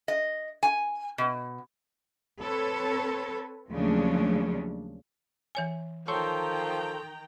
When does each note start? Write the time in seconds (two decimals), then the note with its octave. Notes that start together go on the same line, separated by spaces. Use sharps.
0.08 D#5
0.63 G#5
1.18 B2
2.41 C4 A4 B4 C#5
3.71 D#2 C#3 F3 F#3 A3 D4
5.55 E3 C#5 G#5
6.08 D#3 F3 A4 C#5 G5 A#5 C6 C#6